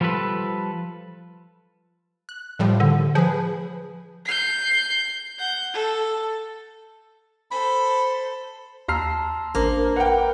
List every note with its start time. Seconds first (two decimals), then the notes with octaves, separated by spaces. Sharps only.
0.01 F3 G3 F4 A4 B4
2.29 F#6
2.59 A2 F3 G3
2.80 D3
3.15 F3 G#4 B4
4.25 G6 C7
5.39 F#5 G6
5.73 A4
7.51 A4 C5 B5
8.88 D#2 A5 A#5 C6 E6 F6 C7
9.55 A1 A#3 D4 C5
9.96 B4 F#5 G5 C#7